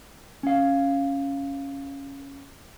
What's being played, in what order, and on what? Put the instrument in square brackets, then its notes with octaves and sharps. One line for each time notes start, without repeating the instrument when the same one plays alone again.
[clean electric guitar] C#4 F5